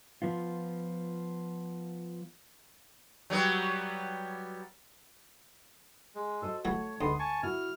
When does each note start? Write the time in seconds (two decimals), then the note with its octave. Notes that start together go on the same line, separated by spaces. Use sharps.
0.22 F3 B3 F4
3.30 F#3 G3 B3
6.15 G#3
6.42 F#4 A4 C5 D#5
6.65 E3 F#3 A3 F#4 C#5
7.01 D2 G#2 B3 C6 D#6
7.19 G#5 A5 C#6
7.43 E4 F#4 F6